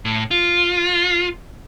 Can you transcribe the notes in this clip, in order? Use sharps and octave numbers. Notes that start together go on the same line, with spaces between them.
A2
F4